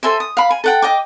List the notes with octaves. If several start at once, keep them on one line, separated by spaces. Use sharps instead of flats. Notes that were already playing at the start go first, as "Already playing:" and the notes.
A4 C5 E5 G#5
D#6
F5 B5
G#5
A4 F#5 G5
D#5 G5 D6